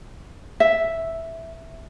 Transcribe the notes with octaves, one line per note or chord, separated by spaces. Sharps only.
E5